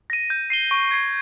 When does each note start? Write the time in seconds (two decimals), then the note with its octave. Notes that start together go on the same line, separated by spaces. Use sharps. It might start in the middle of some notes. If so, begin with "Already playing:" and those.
0.10 A#6 D#7
0.30 G6
0.50 C7 D#7 G7
0.71 C#6
0.91 G#6 C7